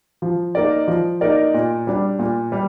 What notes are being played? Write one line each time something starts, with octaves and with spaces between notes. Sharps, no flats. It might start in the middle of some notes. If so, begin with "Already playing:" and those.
F3
A#3 D#4 A#4 D5
F3
A#3 D#4 A#4 D5
A#2
G3 D4
A#2
G3